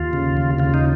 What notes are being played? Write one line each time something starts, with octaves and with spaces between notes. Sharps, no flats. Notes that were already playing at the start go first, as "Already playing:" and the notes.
Already playing: D#2 F4
C#3
D#2
C#3 F4
D#4